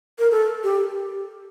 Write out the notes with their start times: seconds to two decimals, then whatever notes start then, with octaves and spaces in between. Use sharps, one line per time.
0.19 A#4
0.31 A4
0.64 G4